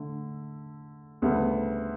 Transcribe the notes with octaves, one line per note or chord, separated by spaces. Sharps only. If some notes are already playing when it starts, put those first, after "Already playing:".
Already playing: D3 A3
D2 C#3 G3 B3